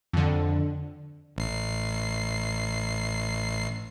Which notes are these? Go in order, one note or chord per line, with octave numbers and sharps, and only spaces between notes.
F2 D3
A1 C7